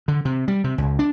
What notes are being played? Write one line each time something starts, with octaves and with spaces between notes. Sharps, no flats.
D3
C3
G3
C3
C#2
D4